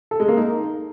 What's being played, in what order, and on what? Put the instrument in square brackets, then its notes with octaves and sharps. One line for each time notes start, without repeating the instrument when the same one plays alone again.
[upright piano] A4
G#3
A#3
D#4